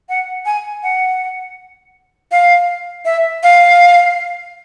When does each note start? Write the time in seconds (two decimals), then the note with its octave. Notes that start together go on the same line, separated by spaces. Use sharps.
0.09 F#5
0.46 G#5
0.83 F#5
2.31 F5
3.05 E5
3.43 F5